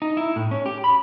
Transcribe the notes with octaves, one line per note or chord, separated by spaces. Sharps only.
D#4
E4
A2
C#4
G4
B5